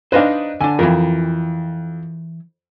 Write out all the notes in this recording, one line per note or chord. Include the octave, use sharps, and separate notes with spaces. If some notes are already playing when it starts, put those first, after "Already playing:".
D4 D#4 B4 C5 D#5 F5
D3 D4 G#5
F2 E3 A#4